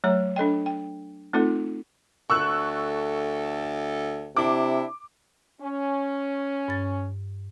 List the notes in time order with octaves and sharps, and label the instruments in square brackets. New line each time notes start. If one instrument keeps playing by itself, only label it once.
[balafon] F#3 A3 C#5 A#5
D4 A4 D#5 G5
G5
A3 C4 D#4 F4 A4
[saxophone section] D2 A4 [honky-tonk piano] C#6 E6 F#6
[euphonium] C3 [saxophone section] D4 E4 [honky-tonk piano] D6
[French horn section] C#4
[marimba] G2 A6